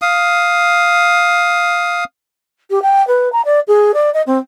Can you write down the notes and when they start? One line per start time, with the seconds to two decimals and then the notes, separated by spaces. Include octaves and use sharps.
0.02 F5 D#6
2.70 G4
2.82 G5
3.07 B4
3.32 A#5
3.45 D5
3.68 G#4
3.94 D5
4.14 D#5
4.27 C4